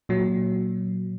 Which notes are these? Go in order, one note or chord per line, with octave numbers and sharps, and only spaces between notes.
A#2 F#3